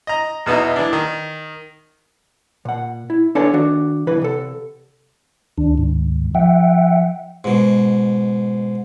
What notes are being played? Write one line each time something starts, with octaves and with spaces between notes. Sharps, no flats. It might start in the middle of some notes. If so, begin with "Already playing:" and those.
D#5 A#5
E2 B2 B3 D#4 E4
E3 D4
D#3
A#2 F#5
E4
D4 A4 B4 C#5 G#5 A5
D#3 D4 F#4
B1 E2 E3 B4
C3 A4
D2 D#3 D4
G#2
F3 E5 F#5 G5
G#2 B2